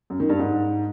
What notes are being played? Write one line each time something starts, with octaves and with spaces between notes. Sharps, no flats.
F#2
D#3
G2
G#2